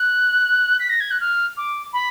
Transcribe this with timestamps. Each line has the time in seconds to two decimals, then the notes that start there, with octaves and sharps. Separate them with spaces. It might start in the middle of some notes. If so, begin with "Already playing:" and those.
Already playing: F#6
0.80 B6
0.90 A#6
1.00 G#6
1.11 F#6
1.21 F6
1.57 D6
1.93 B5